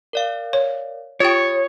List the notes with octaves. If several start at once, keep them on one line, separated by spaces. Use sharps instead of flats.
A#4 D5 F5
C#5
F4 G4 C#5 G5 D#6 A6